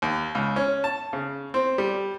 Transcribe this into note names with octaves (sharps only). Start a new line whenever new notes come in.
D#2
C#2
C#4
A5
C#3
C4
G3